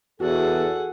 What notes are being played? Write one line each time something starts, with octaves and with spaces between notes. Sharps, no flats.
E2 F#4 G#4 A4 F#5